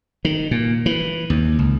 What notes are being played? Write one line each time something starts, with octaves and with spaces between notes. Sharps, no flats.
D#3
A#2
E3
D#2
C#2